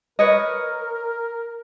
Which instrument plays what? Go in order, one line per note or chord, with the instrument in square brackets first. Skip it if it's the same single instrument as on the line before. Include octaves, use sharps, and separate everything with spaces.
[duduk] A#4 [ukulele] B4 C#5 D#5